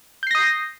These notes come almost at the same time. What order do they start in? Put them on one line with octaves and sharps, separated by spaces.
G6 C7 A#6 D#6